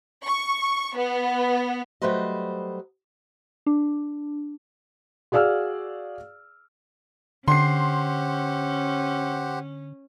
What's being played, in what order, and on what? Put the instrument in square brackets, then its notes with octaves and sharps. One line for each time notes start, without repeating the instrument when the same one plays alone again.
[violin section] C#6
B3
[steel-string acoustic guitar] F#3 G3 A3 B4 C5 D#5
[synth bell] D4
[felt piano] F#4 G#4 D5 F5 E6 F6
[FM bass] D3 [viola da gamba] C#4 [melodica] G4 C5 F#5 [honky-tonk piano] C6 C7